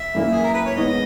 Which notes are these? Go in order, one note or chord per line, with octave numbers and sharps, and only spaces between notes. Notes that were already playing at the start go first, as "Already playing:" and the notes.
Already playing: E5
F#2 E3 A#3 E4
G#4
A#4
B4
C#5
G#2 E3 B3 D#5